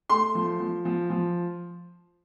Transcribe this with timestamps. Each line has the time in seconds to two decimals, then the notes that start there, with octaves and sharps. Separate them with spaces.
0.10 A3 C6
0.35 F3
0.60 F3
0.85 F3
1.10 F3